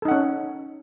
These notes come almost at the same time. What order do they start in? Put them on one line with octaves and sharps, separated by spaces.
A4 D#4 F#5 C#4